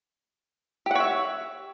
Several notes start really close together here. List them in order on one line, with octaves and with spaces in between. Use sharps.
G4 F#5 C#5 E5